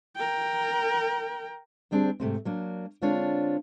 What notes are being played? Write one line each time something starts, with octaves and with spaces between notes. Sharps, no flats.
A#4 G5
D2 G3 C4 D4 G#4
G#2 C3 A3 C4
F#3 A#3 D4
D3 G#3 C4 D4 F4 C#5